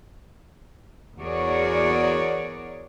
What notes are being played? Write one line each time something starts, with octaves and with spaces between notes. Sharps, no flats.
E2 F#4 G#4 A#4 C#5 D5